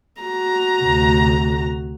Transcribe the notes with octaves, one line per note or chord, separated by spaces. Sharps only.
F#4 A#5
D2 C3